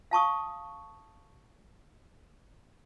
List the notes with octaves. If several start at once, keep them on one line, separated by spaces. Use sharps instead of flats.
F5 A5 C#6 D#6